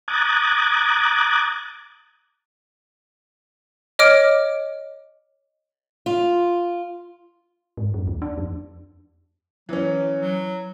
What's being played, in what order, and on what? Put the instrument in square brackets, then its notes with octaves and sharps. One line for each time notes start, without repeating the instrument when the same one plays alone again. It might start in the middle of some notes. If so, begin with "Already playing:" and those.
[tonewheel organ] A#5 D6 D#6 F#6 G#6 A6
[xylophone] C#5 D#5 D6 F6 D7
[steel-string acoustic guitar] F4
[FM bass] G#2
F#2
D#2
D4
F2
[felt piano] E3 C#4 [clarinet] F#3
[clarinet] F#3